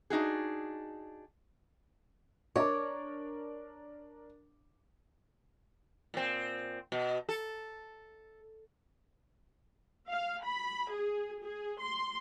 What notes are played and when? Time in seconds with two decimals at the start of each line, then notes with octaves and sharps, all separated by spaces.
0.10 D4 D#4 F#4 G#4
2.56 D4 F#4 A#4 C#5 D#5 E5 D6
6.14 A#2 C4
6.92 B2
7.29 A4
10.09 F5
10.44 B5
10.92 G#4
11.43 G#4
11.80 C6